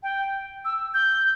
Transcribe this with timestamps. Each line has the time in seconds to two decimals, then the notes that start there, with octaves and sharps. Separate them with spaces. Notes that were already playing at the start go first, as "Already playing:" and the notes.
0.03 G5
0.65 E6
0.94 G6